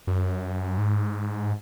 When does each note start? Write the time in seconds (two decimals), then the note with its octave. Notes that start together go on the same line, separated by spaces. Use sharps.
0.07 F#2
0.78 G#2